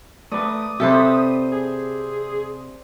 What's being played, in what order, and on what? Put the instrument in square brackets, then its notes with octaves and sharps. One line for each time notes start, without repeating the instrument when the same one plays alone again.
[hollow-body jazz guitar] A3 B4 [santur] D5 [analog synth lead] D#6
[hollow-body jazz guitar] C3 [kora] G4 A4 B4 [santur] C5 E5
[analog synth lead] G#4